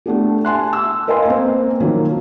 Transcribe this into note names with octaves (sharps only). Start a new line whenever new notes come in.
A3 B3 D4 G4
G#5 A5 C6 F#6
E6
A#4 B4 D#5 F5 G#5 C6
A#3 C4
D#3 F3 F#3 A#3 C#4 F#4